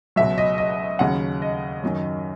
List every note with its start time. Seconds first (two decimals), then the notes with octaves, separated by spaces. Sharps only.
0.16 C#2 B2 F#3 E5
0.38 D#5
0.58 D#5
0.99 D#2 C#3 F#3 F#5
1.42 D#5
1.83 F#2 D#3 F#3